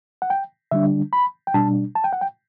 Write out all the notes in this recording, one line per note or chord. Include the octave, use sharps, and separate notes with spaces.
F#5
G5
D3 G3 D4 E5
B5
G5
B2 G3 D4 A5
A5
G5
F#5
G5